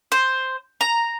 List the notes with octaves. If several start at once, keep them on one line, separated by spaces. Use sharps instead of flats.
C5
A#5